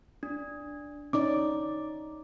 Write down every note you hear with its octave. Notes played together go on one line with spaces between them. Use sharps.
D4
C#4 D#4 D5 D6